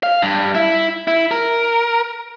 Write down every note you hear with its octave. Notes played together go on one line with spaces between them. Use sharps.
F5
G2
E4
E4
A#4